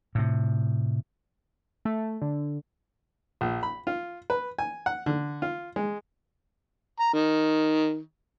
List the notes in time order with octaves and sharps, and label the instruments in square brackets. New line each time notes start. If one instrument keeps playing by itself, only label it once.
[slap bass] A2 C3
[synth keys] A3
D3
[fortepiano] A#1
B5
F4
B4
G#5
F#5
D3
F4
G#3
[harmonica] A#5
D#3